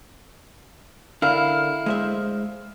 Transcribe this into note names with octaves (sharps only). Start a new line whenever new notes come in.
D3 E4 A#4 F5 F6
G#3 C5 E5